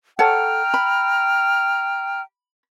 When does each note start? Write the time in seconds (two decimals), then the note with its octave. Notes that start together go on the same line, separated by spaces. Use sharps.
0.19 A4 C#5 F#5 G5 A#5 F6
0.74 B5